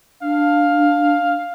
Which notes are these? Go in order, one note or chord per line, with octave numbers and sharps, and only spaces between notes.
D4 F5